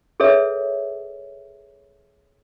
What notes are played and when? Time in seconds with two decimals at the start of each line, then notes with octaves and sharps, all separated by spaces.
0.20 G#4 A4 B4 C#5 E5